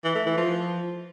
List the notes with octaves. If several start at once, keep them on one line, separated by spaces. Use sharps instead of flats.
E3
A3
E3
F3